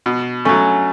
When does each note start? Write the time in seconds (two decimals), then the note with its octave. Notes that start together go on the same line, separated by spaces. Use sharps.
0.06 B2
0.45 F#3 A3 C#4